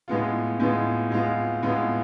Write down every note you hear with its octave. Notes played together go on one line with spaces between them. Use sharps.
A2 G#3 B3 F4
A2 G#3 B3 F4
A2 G#3 B3 F4
A2 G#3 B3 F4